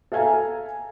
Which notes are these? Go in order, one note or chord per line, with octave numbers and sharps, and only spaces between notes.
A4 E5 F5 G#5 A#5